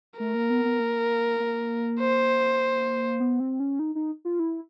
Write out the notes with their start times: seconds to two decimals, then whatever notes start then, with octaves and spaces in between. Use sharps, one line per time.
0.20 A3 A#4
0.35 A#3
0.50 B3
0.65 B3
0.80 A#3
1.40 A#3
2.00 C5
3.20 B3
3.40 C4
3.60 C#4
3.79 D#4
3.95 D#4
4.25 F4
4.39 E4